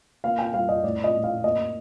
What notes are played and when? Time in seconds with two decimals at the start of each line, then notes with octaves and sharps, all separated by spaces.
0.24 A#3 F5
0.39 G5
0.54 G3 F5
0.69 D#5
0.84 A2 D5
1.04 D#5
1.14 A2
1.24 F5
1.44 A#3 D#5